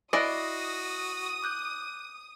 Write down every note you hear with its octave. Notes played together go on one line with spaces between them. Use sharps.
E4 F#4 D5 D#5 D#6 F#6 A#6 C7
D6 F#6 G6